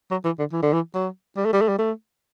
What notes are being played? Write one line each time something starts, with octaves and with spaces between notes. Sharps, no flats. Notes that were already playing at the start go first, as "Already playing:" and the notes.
F#3
E3
D3
E3
D3
E3
F#3
G3
A3
G3
A3
G3
A3